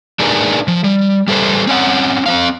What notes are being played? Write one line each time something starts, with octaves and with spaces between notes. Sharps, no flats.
D4 D#4 G#4 A#4 B4
F3
G3
G3 A4 B4 C5
C4 C#4 F#5
C4 C5 F5